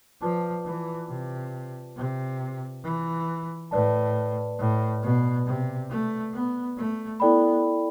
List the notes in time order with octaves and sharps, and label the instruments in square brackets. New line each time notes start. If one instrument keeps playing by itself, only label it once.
[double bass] F3 [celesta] F4 B4 D5 A5 D6
[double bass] E3
C3
C3
E3
[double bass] A2 [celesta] B4 D5 A5
[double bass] A2
B2
C3
A3
B3
A3
[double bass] B3 [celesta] E4 A4 D5 G5 B5